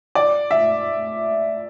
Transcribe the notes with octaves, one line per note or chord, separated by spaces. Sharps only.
D5
E5